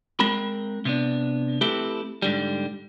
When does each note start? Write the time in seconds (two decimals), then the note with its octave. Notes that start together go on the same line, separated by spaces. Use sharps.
0.20 G#3 C4 A#4 B5
0.85 C3 B3 D4
1.61 A3 C4 E4 G4 A4 B4
2.22 G#2 D3 G3